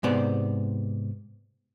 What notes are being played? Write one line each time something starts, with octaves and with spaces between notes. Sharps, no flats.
G#2 C3 B3 C5 D5